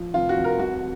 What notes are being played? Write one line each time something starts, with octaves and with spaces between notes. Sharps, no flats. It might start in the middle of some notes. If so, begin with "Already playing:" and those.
Already playing: F3
F1 F4
F#4
F1
A#4
C2 F#4